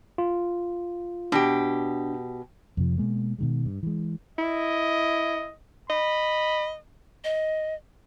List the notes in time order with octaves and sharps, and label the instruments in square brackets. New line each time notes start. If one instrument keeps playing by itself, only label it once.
[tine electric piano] F4
[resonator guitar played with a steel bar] B2 G4 [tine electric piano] D4
[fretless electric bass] F2 C3 F3
B2 G#3 A#3
B2 D#3 G#3
G2
E3 G#3
[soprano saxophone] E4 [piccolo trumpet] D#5
[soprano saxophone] D#5 [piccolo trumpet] B5
[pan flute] D#5